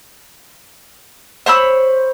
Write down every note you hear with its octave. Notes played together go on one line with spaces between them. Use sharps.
C5 C#5 B5 E6